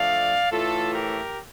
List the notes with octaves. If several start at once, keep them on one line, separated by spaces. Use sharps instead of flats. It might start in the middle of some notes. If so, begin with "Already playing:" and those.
Already playing: F3 A3 D4 D5 F5
A2 E3 A3 F4 A4
G4 A#4